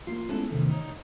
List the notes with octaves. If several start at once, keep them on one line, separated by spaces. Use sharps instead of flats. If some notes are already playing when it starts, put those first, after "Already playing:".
A#3 F4
G#3 B3 C#4 E4 A4
E2 A2 C3 D#3
D#4 C#5